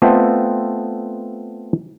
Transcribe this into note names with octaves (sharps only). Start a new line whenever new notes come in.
A3 B3 C4 F4 A4 D#5